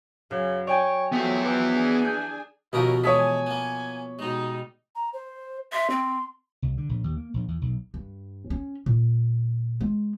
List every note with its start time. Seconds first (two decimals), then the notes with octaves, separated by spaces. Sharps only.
0.31 F#2 C#3
0.67 C#5 D5 G5 G#5
1.12 F3 F#3 A3 B3 E5
1.44 E3 D6
1.72 D4 G#4 G#5
2.05 G6
2.73 D#2 B2 F3 C#4 E4 F#4 A#4 D#6
3.04 E3 G#3 A4 C#5 D5 G#5 D#6 B6
3.46 A#3 B3
4.19 B2 G3 G#3 D#4
4.95 A#5
5.13 C5
5.73 E5 C6
5.90 C4
6.62 C2
6.77 D3
6.89 A#1
7.04 D#2
7.17 A#3
7.34 A#1
7.48 E2
7.61 B1
7.94 G2
8.50 C#4
8.86 A#2
9.81 G#3